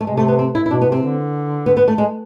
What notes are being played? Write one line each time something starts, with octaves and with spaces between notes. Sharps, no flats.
A3
C3 G#3
A3
B3
C4
E4
E4
B2 D4
B3
C3
C4
D3
B3
B3
A3
G#3